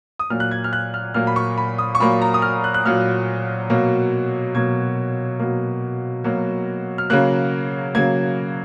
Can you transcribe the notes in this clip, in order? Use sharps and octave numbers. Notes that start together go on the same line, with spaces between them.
D#6
A#2 F#3 A#3 F6
F#6
G#6
F6
F#6
F6
A#2 F#3 A#3 F6
B5
C#6
B5
D#6
C#6
A#2 F#3 A#3 B5
A#5
D#6
F6
F#6
F#6
A#2 F#3 A#3 F6
B2 F#3 A#3
B2 F#3 A#3 G#6
B2 F#3 A#3
B2 F#3 A#3
F6
C#3 F#3 A#3 F#6
C#3 F#3 A#3 G#6